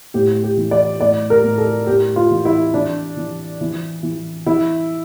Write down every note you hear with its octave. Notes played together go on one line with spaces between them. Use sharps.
A2 G4
G4
E3
D5
A2 D5
A#4
A2
A4
A2 G4
F4
E3
E4
E3 D4
E3
E3
E3
E3 E4